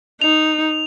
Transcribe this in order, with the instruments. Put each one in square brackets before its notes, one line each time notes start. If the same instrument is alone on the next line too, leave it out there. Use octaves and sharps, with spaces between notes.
[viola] D#4 [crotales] F7